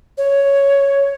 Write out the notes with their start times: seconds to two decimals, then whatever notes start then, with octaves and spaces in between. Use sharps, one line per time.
0.18 C#5